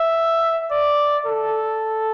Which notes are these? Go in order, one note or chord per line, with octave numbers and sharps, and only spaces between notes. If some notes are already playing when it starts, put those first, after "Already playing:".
Already playing: E5
D5
A4